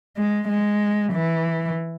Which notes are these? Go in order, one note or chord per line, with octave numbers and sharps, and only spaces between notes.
G#3
G#3
E3